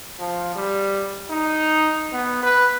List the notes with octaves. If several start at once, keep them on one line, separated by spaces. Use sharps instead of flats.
F3
G3
D#4
B3
B4